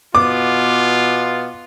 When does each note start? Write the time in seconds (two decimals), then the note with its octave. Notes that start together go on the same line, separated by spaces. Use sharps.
0.15 B2 B3 F4 D6